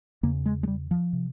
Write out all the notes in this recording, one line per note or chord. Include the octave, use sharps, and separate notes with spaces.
E2 C#3 A#3
G#3
G#3
G3
F3
C3